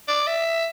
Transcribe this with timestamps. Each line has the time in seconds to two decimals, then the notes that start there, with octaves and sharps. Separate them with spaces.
0.08 D5
0.27 E5